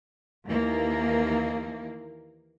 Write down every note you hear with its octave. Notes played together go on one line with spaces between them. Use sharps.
D#2 E3 A#3